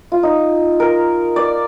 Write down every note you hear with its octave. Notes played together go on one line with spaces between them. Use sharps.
F4
D#4
A#4
D5